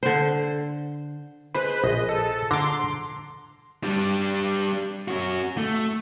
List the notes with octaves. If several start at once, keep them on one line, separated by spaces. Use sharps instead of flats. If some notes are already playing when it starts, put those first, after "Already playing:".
D3 C5
G#3 B4 C5
A#1 D#5
A4
D3 A#5 C6 D6
G3 D4
C#4 F#4
A3